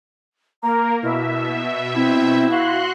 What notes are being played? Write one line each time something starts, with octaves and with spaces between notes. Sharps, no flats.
A#3 A#4 A#5
B2 E4 E5
C4 E4
F#4 F5 C6 F#6